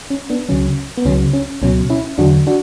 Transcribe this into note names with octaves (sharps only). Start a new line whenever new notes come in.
C#4
B3 D4
C#2 C#3 F#3 C#4
B3
C#2 C#3 F#3 C#4
C#4
C#2 B2 F#3 C#4
C#4 E4
E2 D3 F#3 D4 F#4
D4 F#4